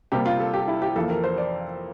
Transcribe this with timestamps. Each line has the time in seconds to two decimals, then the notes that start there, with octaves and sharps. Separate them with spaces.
0.12 C3 G3 A#3 G4
0.26 F4
0.40 A4
0.54 G4
0.68 E4
0.82 G4
0.96 F2 E3 A#3 A4
1.10 A#4
1.24 C5
1.38 D5